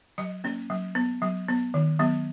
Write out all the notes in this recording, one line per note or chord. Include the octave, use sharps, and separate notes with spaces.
F#3 D#5
A#3 C#4
F#3
B3
F#3
B3
D#3
F#3 B3